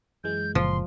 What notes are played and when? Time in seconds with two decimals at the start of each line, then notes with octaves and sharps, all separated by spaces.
0.24 F#2 E3 G#3 G6
0.55 F#1 A#2 C#3 F3 C6